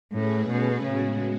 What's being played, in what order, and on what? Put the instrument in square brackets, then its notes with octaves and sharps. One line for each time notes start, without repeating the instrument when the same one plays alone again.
[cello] A2 [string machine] A3 C#4 G#4 B4
[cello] B2
[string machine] A2 G#3 B3 F#4 [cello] C#3